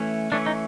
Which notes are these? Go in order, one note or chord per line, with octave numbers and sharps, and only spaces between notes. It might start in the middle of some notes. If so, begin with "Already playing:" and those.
Already playing: E3 A3 C#4
E3 A3 C#4 D4
D#4